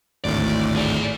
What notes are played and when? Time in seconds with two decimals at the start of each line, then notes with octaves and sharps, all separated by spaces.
0.24 G#1 D2 A2 D5
0.76 G#4 D5